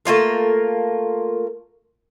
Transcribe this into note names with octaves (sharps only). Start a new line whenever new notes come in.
A3 A#3 F4 A#4